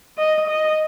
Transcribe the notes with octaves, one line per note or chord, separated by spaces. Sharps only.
D#5
D#5